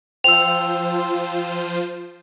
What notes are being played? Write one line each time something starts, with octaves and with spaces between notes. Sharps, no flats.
F3 F4 C5 G5 E6 F7